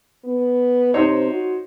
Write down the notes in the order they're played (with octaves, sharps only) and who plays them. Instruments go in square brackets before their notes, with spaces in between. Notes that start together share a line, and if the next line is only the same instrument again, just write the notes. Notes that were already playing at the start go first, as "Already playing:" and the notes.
[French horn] B3
[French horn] C3 [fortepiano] D#4 C5 C#5
[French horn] F#4